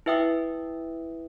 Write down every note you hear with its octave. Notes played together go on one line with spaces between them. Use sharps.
E4 B4 E5 G5 D#6